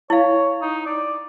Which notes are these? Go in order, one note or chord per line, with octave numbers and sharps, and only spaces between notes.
E4 C#5 F5
D#4
D5